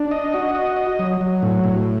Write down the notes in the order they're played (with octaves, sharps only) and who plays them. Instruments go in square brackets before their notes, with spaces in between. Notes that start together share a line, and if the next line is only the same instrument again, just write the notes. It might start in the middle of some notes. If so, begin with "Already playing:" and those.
Already playing: [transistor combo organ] D4
D#5
F#4
D#5
D#5
F#3
F#3
A2
A2